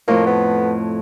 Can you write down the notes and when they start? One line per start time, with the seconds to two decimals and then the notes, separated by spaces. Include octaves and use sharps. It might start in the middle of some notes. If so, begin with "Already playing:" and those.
0.08 F2 A2 A#3
0.27 B3